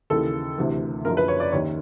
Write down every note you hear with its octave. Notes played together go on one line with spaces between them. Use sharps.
D#2 C#3 E3 A4
D2 C3 E3
F#1 F#2 D3 F3 A#4
B4
C#5
D5
D#2 D#3 C#5